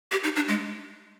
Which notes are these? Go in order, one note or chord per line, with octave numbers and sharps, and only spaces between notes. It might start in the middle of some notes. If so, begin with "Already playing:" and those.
G4
D#4
D4
G#3